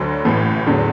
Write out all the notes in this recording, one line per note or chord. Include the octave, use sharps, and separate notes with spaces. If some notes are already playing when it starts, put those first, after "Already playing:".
Already playing: D2 D3 F#3
A1 A2 E3
E2 D3 F#3